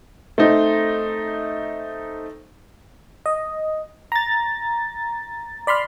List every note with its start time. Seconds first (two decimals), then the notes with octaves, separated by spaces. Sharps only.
0.38 A3 C4 D#4
3.26 D#5
4.12 A#5 A6
5.67 D5 B5 C6 F6